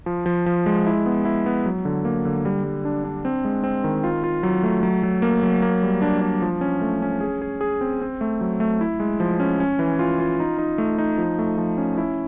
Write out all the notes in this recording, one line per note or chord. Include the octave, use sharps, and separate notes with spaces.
F3
F3
F3
G#3
E4
B3
E4
B3
F#3
D3
A#3
D3
G3
G3
D4
D4
C4
G#3
C4
D#3
F4
F4
F#3
A3
F#3
F#3
A#3
F#3
A#3
G3
D4
D4
F3
C#4
A3
C#4
G#4
G#4
G#4
C4
C4
A3
F#3
A3
E4
G#3
F3
C#4
C#4
E3
F4
F4
D#4
D#4
A3
D#4
F3
A3
F3
C#4
E4